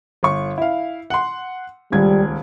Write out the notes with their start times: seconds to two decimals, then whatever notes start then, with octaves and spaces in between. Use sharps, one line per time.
0.23 G1 C#6
0.58 E4 F5
1.10 F#5 C6
1.92 D#1 C#2 G3 G#6